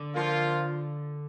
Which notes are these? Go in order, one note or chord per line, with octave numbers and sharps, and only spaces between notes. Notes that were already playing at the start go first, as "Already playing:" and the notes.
Already playing: D3
F3 A#3 F4